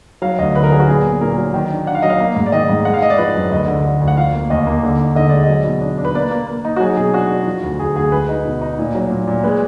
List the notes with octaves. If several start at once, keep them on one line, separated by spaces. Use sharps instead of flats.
F#3 F5
D2 D#5
D3 B4
A#4
F#3 G#4
F#4
A#2 G#4
B3
A#2 A#4
F#3
D#3
D4
D4 F#5
F5
F#3 D#5
F5
A#3
G#2
D5
D#3 D#5
G#2
G#3 F#5
F5
G#3 D#5
D5
F3 B4
F#2
D2 D#5
D3
D3
D2
F#5
F3 F5
A#3
D#2 D#5
A#3
D3
D#4
D3 D#5
G#3 D5
D#5
F#3
B2
D4
D4
B4
A#3 D5
A#3
A#3
D#4
F#4
F#3 G#4
B2 G#4
D4 F#4
D4
F3
D2
D2 G#4
D2 G#4
G#3 B4
D#4
B2
D#4
A#2
F#3
A#2
A#2
G#3 B4